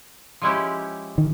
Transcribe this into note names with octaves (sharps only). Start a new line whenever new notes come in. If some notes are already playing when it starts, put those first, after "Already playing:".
F3 G#3 C#4 E4 G4
D#3